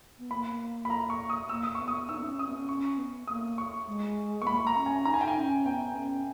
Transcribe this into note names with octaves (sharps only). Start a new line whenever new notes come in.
B3
A#3 B5
B5
A#5
C#6
D#6
A#3 E6
D#6
B3 C#6
D#6
D#4 E6
B3
C#4
C#4 D#6
B3
C#4
C#4 C#6
B3
A#3 D#6
C#6
G#3
B3 C#6
A#3 B5
A#5
C#4
G#5
D#4 A#5
G#5
G5
G#5
C#4
B3 G5
C#4